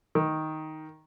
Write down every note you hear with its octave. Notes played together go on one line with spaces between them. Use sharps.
D#3